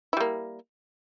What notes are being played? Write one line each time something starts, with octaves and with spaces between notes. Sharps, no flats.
G3 A#3 E4